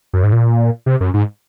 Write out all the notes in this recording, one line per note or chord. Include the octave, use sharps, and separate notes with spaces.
F#2
G#2
A#2
C3
F#2
G#2